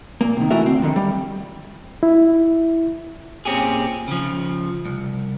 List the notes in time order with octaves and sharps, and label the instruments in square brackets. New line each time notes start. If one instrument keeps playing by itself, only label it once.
[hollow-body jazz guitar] A#2 A#3
C3 D#3
E3 A3 E4 F#4 A#4 E5
D3 C4
D3 D#3 F3
G3
[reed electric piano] E4
[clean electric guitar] A#2 C4 C#4 G4 G#4
C#3 F3
C2